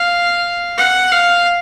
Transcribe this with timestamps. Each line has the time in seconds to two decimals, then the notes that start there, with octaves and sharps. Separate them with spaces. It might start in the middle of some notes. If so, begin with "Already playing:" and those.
Already playing: F5
0.78 F#5
1.11 F5